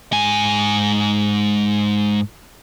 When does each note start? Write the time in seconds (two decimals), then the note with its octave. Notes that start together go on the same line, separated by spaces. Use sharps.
0.12 G#2 G#5